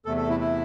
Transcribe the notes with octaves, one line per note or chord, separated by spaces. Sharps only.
E2 C3 A3 A4
A4
E4
E4